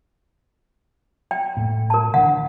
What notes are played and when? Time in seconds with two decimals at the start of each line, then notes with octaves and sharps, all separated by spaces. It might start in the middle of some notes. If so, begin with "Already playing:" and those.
1.31 G5
1.57 A2 A3
1.90 A#4 A5
2.14 D3 E3 D4 F#5